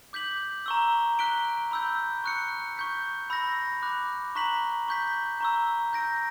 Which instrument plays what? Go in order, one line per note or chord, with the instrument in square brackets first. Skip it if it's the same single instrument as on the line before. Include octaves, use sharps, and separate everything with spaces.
[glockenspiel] D6 G6 B6 F#7
A#5 C#6 E6
F#6 B6 D7 G7
B5 E6 G6
C#6 F#6 C#7
C#6 G6 B6
B5 E6 G6 A#6
B5 D6 F#6
A#5 C#6 F#6 B6 F#7
C#6 G6 B6
A#5 C#6 E6
G6 A#6 D7